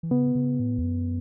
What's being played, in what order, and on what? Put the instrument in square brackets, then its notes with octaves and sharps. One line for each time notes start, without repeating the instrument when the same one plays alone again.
[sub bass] E3
[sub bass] C#3 [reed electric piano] B3
[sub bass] C#3
A2
E2
F#2